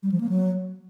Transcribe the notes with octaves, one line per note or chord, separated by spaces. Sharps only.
G3
F3
A#3
F#3